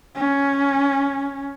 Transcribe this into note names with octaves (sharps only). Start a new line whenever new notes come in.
C#4